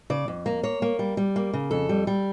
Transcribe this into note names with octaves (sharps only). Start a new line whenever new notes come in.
C#3 D5
F2
A#3
A#3 C#5
A#3
G3
G3
A#3
C#3
F2 A4
G3
G3